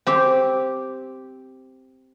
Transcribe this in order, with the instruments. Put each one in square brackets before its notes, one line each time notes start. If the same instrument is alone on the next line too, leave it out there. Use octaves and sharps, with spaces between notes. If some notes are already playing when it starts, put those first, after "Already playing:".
[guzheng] C4 G4